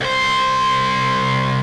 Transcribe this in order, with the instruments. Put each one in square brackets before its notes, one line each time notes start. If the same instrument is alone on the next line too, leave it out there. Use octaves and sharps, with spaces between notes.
[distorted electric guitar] C2 C5